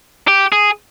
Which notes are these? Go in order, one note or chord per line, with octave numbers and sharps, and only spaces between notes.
G4
G#4